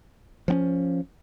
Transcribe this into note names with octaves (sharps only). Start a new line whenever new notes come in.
F3 C4 C#4